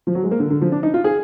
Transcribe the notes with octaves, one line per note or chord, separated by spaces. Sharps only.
F3
F#3
G#3
A#3
D3
D3
F3
D4
D#4
F4
G#4